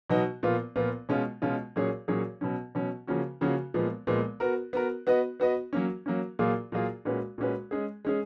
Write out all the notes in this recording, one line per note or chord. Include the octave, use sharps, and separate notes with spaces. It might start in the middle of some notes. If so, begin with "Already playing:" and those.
B2 F#3 B3 D#4 F#4
A#2 F3 B3 F4
A#2 F3 B3 F4
B2 G#3 C#4 F4
B2 G#3 C#4 F4
A#2 F#3 C#4 G#4 C#5
A#2 F#3 C#4 G#4 C#5
B2 F#3 C#4
B2 F#3 C#4
C#3 F3 A#3 C#4 F#4
C#3 F3 A#3 C#4 F#4
A#2 F3 G#3 B3
A#2 F3 G#3 B3
B3 F#4 A#4
B3 F#4 A#4
B3 F#4 B4 D#5
B3 F#4 B4 D#5
F#3 A#3 C#4
F#3 A#3 C#4
A#2 F#3 A#3 F4 G#4
A#2 F#3 A#3 F4 G#4
A#2 G#3 C#4 F#4 B4
A#2 G#3 C#4 F#4 B4
G#3 C#4 G#4
G#3 C#4 G#4